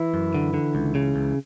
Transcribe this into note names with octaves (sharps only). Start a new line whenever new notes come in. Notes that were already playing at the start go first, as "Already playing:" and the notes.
Already playing: E3 E4
F#2
D3
D3
C#2
C#3
C#2